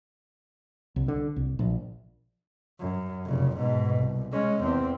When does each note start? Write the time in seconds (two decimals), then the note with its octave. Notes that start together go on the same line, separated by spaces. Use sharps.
0.96 C2
1.08 D3
1.36 C2
1.59 A#1
2.80 F#2
3.25 F1 C#3
3.56 G#2 B2
3.97 C2
4.32 G#3 C#4
4.63 E2 C4